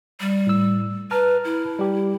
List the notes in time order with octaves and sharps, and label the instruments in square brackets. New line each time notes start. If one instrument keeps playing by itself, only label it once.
[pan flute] G3
[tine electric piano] A2 E6
[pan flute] B4 [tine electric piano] A5 A#5 F6
[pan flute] E4
[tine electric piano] G3 G4